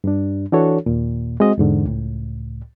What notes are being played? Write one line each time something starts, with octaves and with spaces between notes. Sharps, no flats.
G2 G3 D4
E3 D4 F#4 A4 C#5
D#2 A#2
G#3 C4 F#4 D#5
E2 G#2 D3
C#2 A2